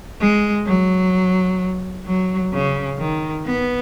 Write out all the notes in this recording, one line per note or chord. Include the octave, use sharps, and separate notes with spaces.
G#3
F#3
F#3
C#3
D#3
B3